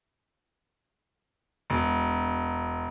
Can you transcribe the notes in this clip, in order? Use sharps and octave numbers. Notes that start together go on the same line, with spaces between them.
E1